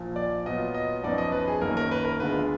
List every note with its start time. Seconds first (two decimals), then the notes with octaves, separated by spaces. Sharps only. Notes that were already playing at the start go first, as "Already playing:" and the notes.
Already playing: A#1 A#2 F3
0.16 D5
0.46 A#2 F#3 B3 F4 D#5
0.74 D#5
1.03 F#2 F3 B3 D#4 D5
1.18 D#5
1.32 B4
1.48 G#4
1.61 F#2 D#3 A#3 A#4
1.77 A#4
1.91 B4
2.05 A#4
2.20 D2 D3 G#3 B3 F4 B4